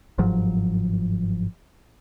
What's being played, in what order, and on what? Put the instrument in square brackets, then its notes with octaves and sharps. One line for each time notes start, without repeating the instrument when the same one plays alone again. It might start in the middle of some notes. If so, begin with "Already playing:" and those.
[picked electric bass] G1 G#2 F3 F#3